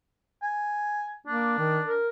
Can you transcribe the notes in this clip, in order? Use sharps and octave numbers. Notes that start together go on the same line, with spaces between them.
G#5
A#3 D4
D#3
A#4